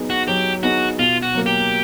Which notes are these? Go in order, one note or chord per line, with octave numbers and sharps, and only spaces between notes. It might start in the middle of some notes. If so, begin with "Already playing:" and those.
Already playing: F#3 B3 D#4 G#4
F#4
F#3 G4
B3 D#4 F#4 G#4
B2 F4
F#4
F#3 A#3
G4